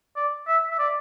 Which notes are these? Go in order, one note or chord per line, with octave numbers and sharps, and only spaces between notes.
D5
E5
E5
D5